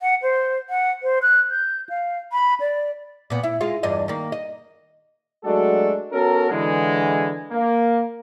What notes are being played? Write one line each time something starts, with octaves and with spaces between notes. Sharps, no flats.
F#5
C5
F#5
C5
F#6
G6
F5
B5
D5
A#2 B3
E4
G#3 F4
E2 G2 D#5
D#3 A#3
D#5
F#3 G#3 A3 D4 F#4 A4
B3 C#4 F#4 A4 A#4
D3 E3 G#3
A#3